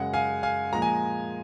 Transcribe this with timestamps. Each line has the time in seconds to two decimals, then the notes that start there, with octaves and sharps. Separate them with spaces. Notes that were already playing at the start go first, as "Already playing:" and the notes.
Already playing: F#2 C#3 G#3 F#5
0.13 F5 G#5
0.43 F5 G#5
0.72 A#2 F3 G#3 A#5
0.82 G#5